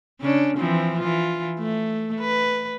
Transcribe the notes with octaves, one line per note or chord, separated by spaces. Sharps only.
C#3 C#4 D4
E3 F3 C4
E3 F4
A3
B4